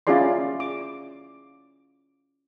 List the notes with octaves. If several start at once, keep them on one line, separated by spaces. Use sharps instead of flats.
C#4 E4 F4 G#4 D5 C6
D6